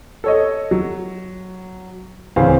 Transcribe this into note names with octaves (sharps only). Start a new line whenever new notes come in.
A4 C#5 D#5
F#3
D1 C#3 E3 C4 F5